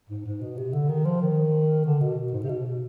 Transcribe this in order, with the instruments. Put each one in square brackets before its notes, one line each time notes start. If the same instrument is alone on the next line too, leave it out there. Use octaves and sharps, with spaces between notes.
[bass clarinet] G#2
G#2
B2
C3
D3
D#3
F3
D#3
D3
B2
G#2
C3
B2